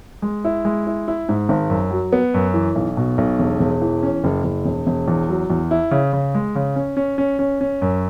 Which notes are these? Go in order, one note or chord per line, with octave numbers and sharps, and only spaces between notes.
G#3
E4
G#3
E4
E4
G#2
G#1
F#2
F#3
B3
F#2
E3
B1
B2
B1
E1
E1
E3
C#4
F#1
F#1
E1
E1
E2
F#3
E2
E4
C#3
C#3
G#3
C#3
C#4
C#4
C#4
C#4
C#4
F#2